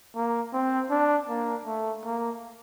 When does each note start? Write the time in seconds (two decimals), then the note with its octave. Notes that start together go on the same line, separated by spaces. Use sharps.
0.15 A#3
0.53 C4
0.90 D4
1.29 A#3
1.66 A3
2.04 A#3